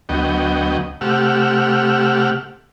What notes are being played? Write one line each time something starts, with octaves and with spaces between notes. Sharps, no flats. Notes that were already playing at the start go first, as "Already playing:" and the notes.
D2 F#3 B3 D#5 G5
C3 A3 G4 F#5 E6 F6